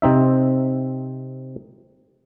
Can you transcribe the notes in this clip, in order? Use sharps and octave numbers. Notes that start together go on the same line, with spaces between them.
C3 C4 D#4 E5